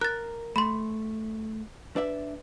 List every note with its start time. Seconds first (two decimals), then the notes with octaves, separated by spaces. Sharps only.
0.01 A#4 F#6 A6
0.56 A3 B5 C6
1.96 D4 B4 D5 E5